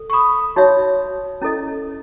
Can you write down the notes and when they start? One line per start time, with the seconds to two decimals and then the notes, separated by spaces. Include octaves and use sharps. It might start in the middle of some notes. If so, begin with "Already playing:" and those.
Already playing: A4
0.10 C#6
0.13 B5 D#6
0.56 D#4 F#4 C#5 E5
1.42 C#4 E4 A4 D#5